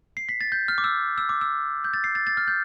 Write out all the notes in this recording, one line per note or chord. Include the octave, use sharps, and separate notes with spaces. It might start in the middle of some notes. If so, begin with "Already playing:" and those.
C7
B6
A6
G6
F6
D6
E6
E6
D6
E6
G6
A6
C7
A6
A6
F6
G6